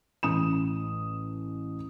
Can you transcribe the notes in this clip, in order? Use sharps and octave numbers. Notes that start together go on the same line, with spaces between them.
A1 D#6 E7